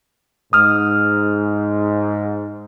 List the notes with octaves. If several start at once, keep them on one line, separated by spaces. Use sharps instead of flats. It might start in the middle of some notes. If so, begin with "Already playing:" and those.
G#2 D#6 F6